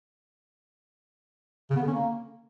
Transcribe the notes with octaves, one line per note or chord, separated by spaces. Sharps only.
C#3
B3
D3
C#4
A#3